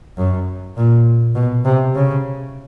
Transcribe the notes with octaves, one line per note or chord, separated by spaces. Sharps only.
F#2
A#2
B2
C3
C#3